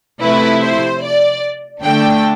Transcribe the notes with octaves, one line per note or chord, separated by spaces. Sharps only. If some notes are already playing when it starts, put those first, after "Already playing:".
C3 F3 A3 E4 B4
C5
D5
D3 A3 D4 G5